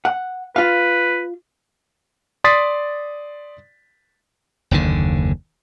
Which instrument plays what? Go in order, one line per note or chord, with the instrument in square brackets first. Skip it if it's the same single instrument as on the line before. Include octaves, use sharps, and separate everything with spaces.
[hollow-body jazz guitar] F#5
[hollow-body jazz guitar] F4 F5 [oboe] B4
[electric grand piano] D5 C6 D#6 A6 B6 C7
[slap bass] F#1 D#2 D3